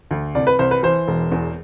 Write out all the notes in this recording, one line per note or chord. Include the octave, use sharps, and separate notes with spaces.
D2
C2 D5
B4
C2 C5
B4
E3 C5
E1
E2